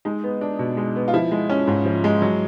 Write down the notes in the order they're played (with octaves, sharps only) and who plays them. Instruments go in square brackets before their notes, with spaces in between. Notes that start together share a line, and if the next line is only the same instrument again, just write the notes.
[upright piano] G#3 D#4
B3
D4
B2
G#3
B3
F4
F3 E4
G#3
C#4
G#2
F3
G#3
F#3